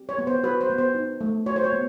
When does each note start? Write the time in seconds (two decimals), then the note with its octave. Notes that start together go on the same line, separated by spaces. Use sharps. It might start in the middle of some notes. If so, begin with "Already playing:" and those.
Already playing: C4 G4
0.09 C#5
0.18 B3
0.27 C5
0.43 F#4 B4
0.61 C5
0.70 B3
0.78 C5
0.95 D#4
1.21 A3
1.46 F#4 C#5
1.56 C5
1.64 C#5
1.72 B3